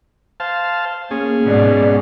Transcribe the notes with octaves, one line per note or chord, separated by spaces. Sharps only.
C5 F5 A5
A#3 C#4 G#4
G#2 B2 D5